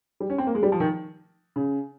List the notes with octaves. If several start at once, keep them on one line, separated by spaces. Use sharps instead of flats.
G3
C#4
C4
A#3
G#3
G3
F3
D#3
C#3